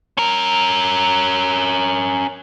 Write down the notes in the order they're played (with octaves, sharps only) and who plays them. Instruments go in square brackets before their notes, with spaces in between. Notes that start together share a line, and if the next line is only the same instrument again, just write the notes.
[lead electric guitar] C#4 A#4